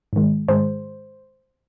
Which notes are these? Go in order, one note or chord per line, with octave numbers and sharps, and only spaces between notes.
G#2 D#3 G#3
G#2 D#3 G#3 C5